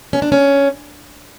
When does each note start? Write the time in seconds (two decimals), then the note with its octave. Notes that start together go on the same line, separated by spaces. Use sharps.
0.13 C#4
0.22 D4
0.32 C#4